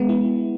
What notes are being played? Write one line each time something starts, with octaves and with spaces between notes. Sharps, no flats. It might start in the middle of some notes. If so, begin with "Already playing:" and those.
Already playing: G#3 B3
E4